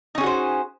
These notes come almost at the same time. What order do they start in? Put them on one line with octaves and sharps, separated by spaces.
D#4 C#4 G#4 F#4 C5